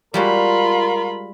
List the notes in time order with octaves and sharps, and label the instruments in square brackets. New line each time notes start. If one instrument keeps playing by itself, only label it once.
[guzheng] G3 G#3 F#4 [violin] F4 B5 [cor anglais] A#4